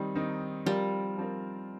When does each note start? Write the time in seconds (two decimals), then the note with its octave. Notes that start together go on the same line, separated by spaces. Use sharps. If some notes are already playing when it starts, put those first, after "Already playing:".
Already playing: D#3 G3 C4 D#4
0.15 D#3 C4 D#4
0.66 F3 G3 C4 F4 A#4
1.17 F3 C4 F4 A#4